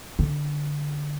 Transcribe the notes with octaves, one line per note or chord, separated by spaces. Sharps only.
D3